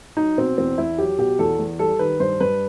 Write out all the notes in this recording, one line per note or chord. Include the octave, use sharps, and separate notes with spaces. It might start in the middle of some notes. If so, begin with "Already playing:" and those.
F#3 D#4
B2 C4
E2 C4
E2 E4
F#3 G4
B2 G4
E2 A4
E2
G3 A4
D#3 B4
G2 C5
G2 B4